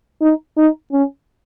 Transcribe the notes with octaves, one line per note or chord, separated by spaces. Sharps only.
D#4
D#4
C#4